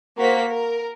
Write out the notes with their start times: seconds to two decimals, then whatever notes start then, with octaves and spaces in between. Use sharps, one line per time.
0.17 A#3 F#4 C5 B6
0.50 A#4